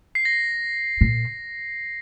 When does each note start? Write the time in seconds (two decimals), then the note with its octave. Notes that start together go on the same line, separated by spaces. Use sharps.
0.15 C7
0.25 A#6
1.01 A#2